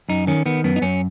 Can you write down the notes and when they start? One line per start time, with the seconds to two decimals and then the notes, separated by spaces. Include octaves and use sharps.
0.09 F#2 D#4
0.27 D#3 C#4
0.46 D#3 B3
0.64 F#2 B3
0.76 D#4
0.82 F#2 C#4